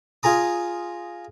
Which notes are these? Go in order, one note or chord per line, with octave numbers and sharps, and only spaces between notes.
F4 G#4 A#5 D#6